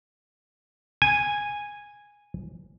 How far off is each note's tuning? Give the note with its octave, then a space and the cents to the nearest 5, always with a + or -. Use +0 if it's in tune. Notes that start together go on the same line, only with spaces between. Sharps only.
G#5 -10